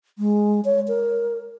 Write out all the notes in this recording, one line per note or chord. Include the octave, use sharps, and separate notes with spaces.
G#3
C#5
A#4